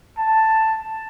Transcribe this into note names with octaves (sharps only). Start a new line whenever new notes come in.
A5